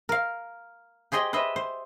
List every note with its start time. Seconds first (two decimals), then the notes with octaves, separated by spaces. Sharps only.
0.09 A#4 F5
1.12 G4 G#4 C5 D#5 G5
1.33 B4 C5 D#5 E5
1.56 C5